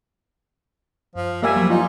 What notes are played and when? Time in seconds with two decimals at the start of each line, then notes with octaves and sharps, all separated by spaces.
1.15 F#2 F3
1.43 G3 A#3 E5 G#5
1.56 F3 F#3
1.70 D#4 F4